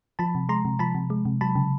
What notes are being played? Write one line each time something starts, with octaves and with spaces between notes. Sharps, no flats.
F3 A5 B5
C3
G#3 A#5 C6
C3
F3 A5 B5
C3
G#3
C3
F#3 A5 B5
C#3